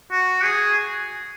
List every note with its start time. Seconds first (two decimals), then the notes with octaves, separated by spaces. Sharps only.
0.11 F#4
0.44 G#4